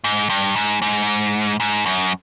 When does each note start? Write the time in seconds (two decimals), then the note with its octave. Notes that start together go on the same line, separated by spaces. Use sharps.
0.04 G#2
0.30 G2
0.56 G#2
0.82 G#2
1.60 G#2
1.86 F#2